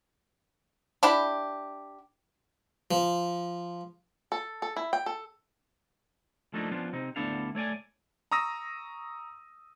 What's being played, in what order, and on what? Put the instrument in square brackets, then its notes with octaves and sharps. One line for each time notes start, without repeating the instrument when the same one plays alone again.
[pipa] D4 E4 G4
[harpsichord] F3
[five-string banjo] A4
A4
E4
G5
A4
[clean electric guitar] F3 A3 A#3 D4 D#4
F3 B3 C#4 D4 F4
C3 C4 D#4
D2 B3 D4 E4 A4 F5
A3 C#5 D5 G#5
[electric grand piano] A#5 C#6 D#6 E6 A#6